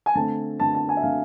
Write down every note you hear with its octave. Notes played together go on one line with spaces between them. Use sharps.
G#5
D3 A3 C4 A5
D3 A3 C4 A5
A5
G#5
E5
D3 A3 C4 F5